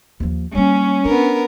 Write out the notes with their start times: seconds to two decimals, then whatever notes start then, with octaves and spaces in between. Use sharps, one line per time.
0.20 D#2 F3
0.55 G3 A#3 C#4
1.05 B3 D4 A#4